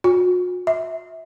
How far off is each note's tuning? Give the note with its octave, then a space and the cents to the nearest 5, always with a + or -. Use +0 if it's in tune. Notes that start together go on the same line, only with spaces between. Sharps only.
F#4 -45
E5 -20